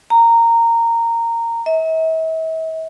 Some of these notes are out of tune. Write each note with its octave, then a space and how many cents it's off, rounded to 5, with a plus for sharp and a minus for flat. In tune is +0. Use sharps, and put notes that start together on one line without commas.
A#5 -15
E5 -40